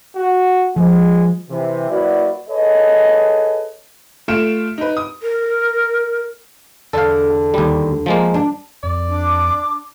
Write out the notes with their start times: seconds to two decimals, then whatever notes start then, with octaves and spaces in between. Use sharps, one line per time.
0.15 F#4
0.76 F3 G#3
1.50 C3 E3
1.90 F#3 A#3 E4 F#4 B4 D5
2.49 G#4 A4 B4 C#5 D#5
4.28 A3 F4 F6 C#7 D7 E7
4.78 D#4 B4
4.97 D#6
5.23 A#4
6.93 E2 D3 D4 A4 F5
7.54 D#2 G3
8.06 F3 G#3 A#3
8.34 D4
8.83 F2 D5
9.08 D4 D6